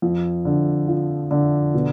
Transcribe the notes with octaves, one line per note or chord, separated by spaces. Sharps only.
F2
D3
F3
D3
B2